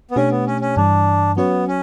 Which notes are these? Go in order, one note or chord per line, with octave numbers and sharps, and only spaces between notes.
B3
B2 A3 C#4 D4 G4 C#5
B3
C#4
C#4
G2 E3 G3 D4
F#3 B3 C#4 F#4 C#5
C#4